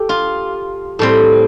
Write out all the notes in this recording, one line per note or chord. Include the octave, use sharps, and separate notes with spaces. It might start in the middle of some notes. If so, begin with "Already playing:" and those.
Already playing: G4 A4
F4
A2 G3 C4